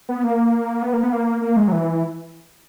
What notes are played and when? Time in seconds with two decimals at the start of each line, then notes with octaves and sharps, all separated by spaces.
0.09 B3
0.24 A#3
0.82 B3
0.93 A#3
1.03 B3
1.12 A#3
1.42 A#3
1.56 G#3
1.68 F#3
1.72 E3